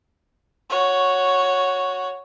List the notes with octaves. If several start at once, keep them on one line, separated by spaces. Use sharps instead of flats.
F#4 C#5